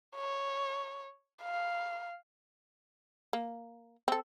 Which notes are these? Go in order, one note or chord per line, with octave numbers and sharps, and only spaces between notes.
C#5
F5
A#3
C4 A4